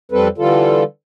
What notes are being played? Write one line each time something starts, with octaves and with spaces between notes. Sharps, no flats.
F2 G3 C4 A4 B4
D3 E3 G3 F4 A4